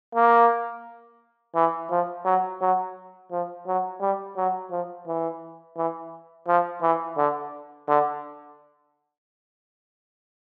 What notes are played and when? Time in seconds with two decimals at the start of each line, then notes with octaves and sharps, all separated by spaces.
0.15 A#3
1.55 E3
1.90 F3
2.25 F#3
2.61 F#3
3.32 F3
3.67 F#3
4.01 G3
4.37 F#3
4.71 F3
5.07 E3
5.77 E3
6.48 F3
6.82 E3
7.17 D3
7.88 D3